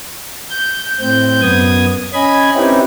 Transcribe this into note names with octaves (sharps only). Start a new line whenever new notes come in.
G6
A2 C4 G6
F#2 B3 D#6 G#6
C#4 D#5 G#5 B5 G#6
C4 C#4 D#4 E4 G4 B4